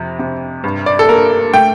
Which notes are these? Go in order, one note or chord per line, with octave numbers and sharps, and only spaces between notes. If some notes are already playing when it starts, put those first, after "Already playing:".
Already playing: F2 C3
C3
G2
D5
A4
A#3 A#4
A3 G5